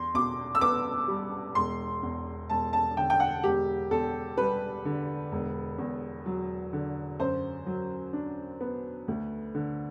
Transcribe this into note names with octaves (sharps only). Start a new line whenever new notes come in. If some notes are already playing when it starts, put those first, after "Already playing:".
Already playing: E2 C6
B2 D6
E6
B3 D6
G3
E1 C6
E2
E1 A5
A5
D3 G5
G5
F#5
E1 G4
E2 A4
G3 B4
D3
E1
E2
F#3
D3
F#2 C5
F#3
D4
B3
D2
D3